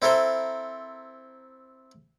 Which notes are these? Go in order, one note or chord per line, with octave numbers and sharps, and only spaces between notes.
C4 E4 A4 A#4 C5 C6